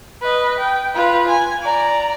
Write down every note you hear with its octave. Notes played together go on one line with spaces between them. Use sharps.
B4 D#5
G5
F4 B4
G#5
D5 A#5